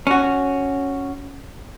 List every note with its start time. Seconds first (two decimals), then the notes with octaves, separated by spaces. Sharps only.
0.07 C#4 F#4